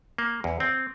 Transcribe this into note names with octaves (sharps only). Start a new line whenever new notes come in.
A#3
E2
C4